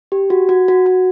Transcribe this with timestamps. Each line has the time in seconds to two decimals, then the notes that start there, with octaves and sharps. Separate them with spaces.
0.12 G4
0.30 F#4
0.49 F#4
0.68 F#4
0.86 F#4